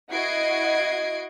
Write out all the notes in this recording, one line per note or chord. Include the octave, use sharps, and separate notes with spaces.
E4 F#4 D#5 G#6 C7 D7